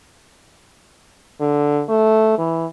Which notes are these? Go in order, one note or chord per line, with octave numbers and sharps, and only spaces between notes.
D3
A3
E3